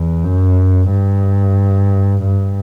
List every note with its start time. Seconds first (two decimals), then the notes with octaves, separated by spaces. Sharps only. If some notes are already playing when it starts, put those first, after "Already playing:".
Already playing: E2
0.24 F#2
0.89 G2
2.23 G2